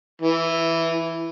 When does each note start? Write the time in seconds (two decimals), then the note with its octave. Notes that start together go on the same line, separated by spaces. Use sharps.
0.22 E3